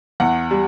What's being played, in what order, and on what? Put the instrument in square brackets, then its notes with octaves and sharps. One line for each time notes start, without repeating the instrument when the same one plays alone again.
[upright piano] E2 F#5
G3